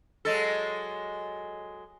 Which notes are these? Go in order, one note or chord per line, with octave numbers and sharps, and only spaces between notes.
F#3 G#3 A4